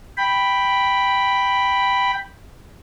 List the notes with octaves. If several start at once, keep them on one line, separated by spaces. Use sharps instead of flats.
G5 B5